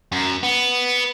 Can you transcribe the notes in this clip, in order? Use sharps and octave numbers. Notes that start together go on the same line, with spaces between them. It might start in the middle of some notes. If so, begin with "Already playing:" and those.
F#2
B3